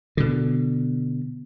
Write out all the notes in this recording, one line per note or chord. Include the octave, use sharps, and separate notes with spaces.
B2 D3